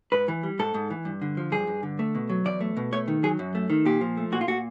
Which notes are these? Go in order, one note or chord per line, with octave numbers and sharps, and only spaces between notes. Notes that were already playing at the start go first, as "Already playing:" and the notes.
G#2 B4
E3
G3
G#2 A4
G#2
E3
G2
D3
F3
G2 G#4
G2
D3
A3
B2
F#3
E2 D5
A3
B2
A3 C#5
D#3
F#3 G#4
F#2
A3
D#3
A#2 G4
F3
A3
A#2 F#4
F4
A#2 F#4